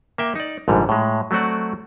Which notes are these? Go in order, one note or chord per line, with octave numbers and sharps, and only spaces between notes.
A#3 E5 G5
D#4 D5
A#1 G#2 D3 G3
A2 G#3
F#3 A3 C4 F#4 D5